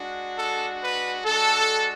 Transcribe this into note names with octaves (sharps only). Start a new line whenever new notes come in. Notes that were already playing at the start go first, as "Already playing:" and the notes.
Already playing: G#3 D4 F#4
A4
B4
G#3 D4 F#4 A4